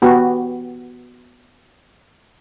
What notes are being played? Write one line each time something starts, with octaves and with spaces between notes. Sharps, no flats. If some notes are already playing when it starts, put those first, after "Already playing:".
B3 F#4 G4